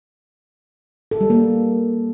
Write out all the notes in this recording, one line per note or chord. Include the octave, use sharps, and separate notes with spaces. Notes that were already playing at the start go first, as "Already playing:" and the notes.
A4
G3
A#3